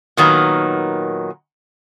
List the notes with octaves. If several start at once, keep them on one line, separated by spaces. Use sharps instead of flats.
A#2 D#3 F#3 B3